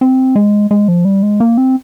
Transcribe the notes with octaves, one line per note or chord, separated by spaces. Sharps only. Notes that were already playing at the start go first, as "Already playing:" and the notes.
C4
G#3
G#3
F3
G3
G#3
A#3
C4